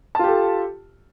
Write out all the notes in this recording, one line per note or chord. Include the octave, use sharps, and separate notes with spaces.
F4 G4 A4 A5